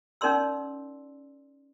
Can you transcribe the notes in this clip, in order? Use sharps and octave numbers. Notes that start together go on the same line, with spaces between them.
C#4 D#4 A#4 D5 C6 E6